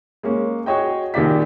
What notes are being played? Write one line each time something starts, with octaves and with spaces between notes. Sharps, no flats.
G#3 A#3 C#4
F#4 G#4 C#5 D#5 G5
A#1 D#3 G4 D5 B6